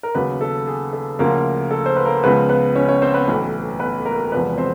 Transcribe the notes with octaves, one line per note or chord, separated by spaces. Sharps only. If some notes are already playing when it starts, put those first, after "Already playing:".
A#4
D#2 C#3 F#3 B3 B4
A4
G#4
A4
D2 C#3 F3 A#3 A#4
A4
C5
B4
A#3 A#4
C#2 C#3 F3 B3 B4
B3 B4
C#4 C#5
C#4 C#5
C4 C5
B3 B4
B1 A2 E3
B3 B4
A#3 A#4
E1 E2 C3 F3 B3 B4
C4 C5